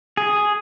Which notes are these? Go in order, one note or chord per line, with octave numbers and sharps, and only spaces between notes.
G#4